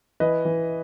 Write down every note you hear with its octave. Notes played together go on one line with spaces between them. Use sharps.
E3 B4 D#5
E3